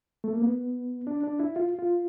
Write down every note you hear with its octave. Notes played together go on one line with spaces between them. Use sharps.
A3
A#3
B3
D4
D4
E4
F4
F4